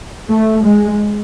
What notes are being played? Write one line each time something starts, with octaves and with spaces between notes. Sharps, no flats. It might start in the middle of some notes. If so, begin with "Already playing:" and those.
A3
G#3